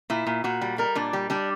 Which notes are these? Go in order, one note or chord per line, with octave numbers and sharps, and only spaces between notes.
A#2 E4
A#2
A#2 F#4
G3
G3 A#4
A#2 D4
G3
G3 D4